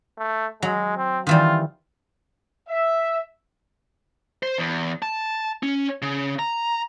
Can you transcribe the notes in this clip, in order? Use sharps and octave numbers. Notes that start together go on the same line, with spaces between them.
A3
F#3 G#3
C4
D#3 E3 G3 F4
E5
C5
E2
A5
C#4
C#3
A#5